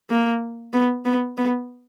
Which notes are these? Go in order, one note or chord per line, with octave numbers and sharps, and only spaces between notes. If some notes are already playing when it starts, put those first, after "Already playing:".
A#3
B3
B3
B3